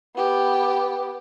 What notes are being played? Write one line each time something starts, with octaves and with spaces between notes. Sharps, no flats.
B3 G4